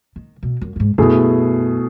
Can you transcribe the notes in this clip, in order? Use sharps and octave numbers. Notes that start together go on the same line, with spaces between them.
D#3
B2
F#2
F#2
G#2
F#2 B2 A3 E4 G#4